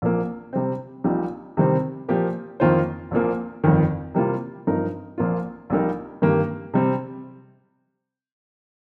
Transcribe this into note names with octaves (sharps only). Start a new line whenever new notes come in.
A#1 A#2 F3 A#3
C3 G3 C4
A#1 A#2 G3 D#4
C3 D#3 G3 C4
A#2 F3 A#3 G4
F2 D#3 A#3 F4 C5
A#1 A#2 F3 A#3
G1 F2 D#3
C3 G3 A#3 F4
G2 F3 D#4 A#4
A#1 A#2 F3 A#3 F4
A#1 A#2 G3 D#4 A#4
G2 D#3 A#3 G4
C3 G3 C4